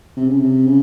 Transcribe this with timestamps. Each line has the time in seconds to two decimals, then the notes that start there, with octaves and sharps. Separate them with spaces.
0.17 C3
0.28 C#3
0.40 C3
0.66 C#3